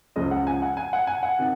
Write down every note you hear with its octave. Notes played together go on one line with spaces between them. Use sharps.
C#2 C#3 F3 G#3 D#5
F#5
G#5
F#5
G#5
F#5
G#5
F#5
C3 D#3